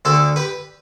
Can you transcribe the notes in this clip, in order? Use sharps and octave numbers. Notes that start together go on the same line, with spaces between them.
D2 D3 A4 D5
G4 B4